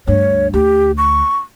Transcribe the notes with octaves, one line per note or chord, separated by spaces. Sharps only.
D2 G2 C#5
D2 G4
C#6